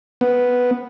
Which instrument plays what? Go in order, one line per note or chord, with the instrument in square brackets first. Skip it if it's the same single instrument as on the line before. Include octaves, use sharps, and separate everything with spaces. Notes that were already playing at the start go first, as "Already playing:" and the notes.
[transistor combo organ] B3